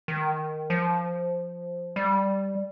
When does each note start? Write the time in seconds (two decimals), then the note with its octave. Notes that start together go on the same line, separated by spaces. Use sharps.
0.08 D#3
0.70 F3
1.96 G3